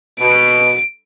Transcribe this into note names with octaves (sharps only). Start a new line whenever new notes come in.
B2 D7